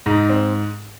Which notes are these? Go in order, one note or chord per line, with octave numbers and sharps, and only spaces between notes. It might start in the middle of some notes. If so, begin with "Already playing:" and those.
G#2 D#4
C4